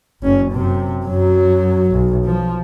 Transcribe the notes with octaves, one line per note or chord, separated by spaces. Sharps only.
F#1 C#4
F#2 C3
F#2 F#3
B1
F3